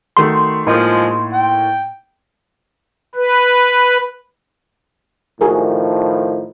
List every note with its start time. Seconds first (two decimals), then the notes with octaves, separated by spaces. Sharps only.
0.17 D#3 A3 F#4 C6
0.67 A2 F3 G#3 A#3 D#4
1.33 G5
3.15 B4
5.41 A2 D#3 F3 F#4 G#4 A#4